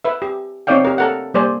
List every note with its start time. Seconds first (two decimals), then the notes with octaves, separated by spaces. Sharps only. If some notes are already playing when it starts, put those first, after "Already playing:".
0.04 B4 E5
0.22 G4
0.67 C4 D#4 C#5 D5 F5 G5
0.85 G4 A#4
0.98 A4 A#4 F#5
1.34 G3 A#3 C5 D5 G#5